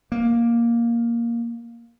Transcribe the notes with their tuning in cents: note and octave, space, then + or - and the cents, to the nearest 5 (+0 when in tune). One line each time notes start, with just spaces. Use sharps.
A#3 +5